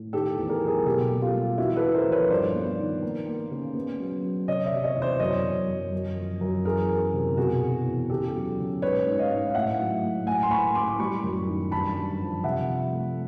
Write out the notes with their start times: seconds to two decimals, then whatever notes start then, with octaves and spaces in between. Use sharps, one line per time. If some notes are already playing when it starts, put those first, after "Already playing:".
Already playing: A2
0.13 D#3 G4 A4
0.38 E2
0.49 G#4 A#4
0.62 F#3
0.67 G#4 A#4
0.86 B2 G4 A4
1.10 A#3
1.21 F4 G4
1.34 G3
1.58 E2 E4 F#4
1.76 A4 B4
1.82 E2
1.94 A#4 C5
2.07 F3
2.12 B4 C#5
2.30 G2 C5 D5
2.55 B3
2.79 D#3
3.02 A#3
3.27 A#3
3.51 C#3
3.75 B3
3.99 F#3
4.23 F#3
4.48 C3 C#5 D#5
4.66 D5 E5
4.72 C3
4.84 C#5 D#5
4.96 E2
5.02 C5 D5
5.20 F#2 C#5 D#5
5.44 F#2
5.68 F#2
5.92 F#2
6.17 F3
6.41 F#2
6.65 E3 G#4 A#4
6.89 E2
7.13 C3
7.37 B2 F#4 G#4
7.61 E2
7.86 E2
8.09 C#3 G4 A4
8.34 F#3
8.58 C#3
8.82 G#2 B4 C#5
9.06 G#2
9.19 D#5 F5
9.30 G#2
9.49 F5
9.55 A2 E5 F#5
9.79 F#3
10.03 A2
10.26 A2 F#5 G#5
10.43 C6
10.51 A2 B5 C#6
10.75 A2 C6 D6
10.88 D6
10.99 G3 B5 C#6
11.24 F#2
11.48 D#3
11.71 G2 A5 B5
11.96 G2
12.20 F3
12.44 C3 E5 F#5
12.68 F3
12.92 A3